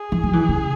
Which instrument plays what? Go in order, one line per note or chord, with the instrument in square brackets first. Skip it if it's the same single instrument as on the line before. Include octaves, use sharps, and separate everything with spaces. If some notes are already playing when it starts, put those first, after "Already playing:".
Already playing: [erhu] G#4
[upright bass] E3
F#3
E3
C#3